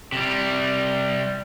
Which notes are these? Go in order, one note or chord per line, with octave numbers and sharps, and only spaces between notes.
C3 G3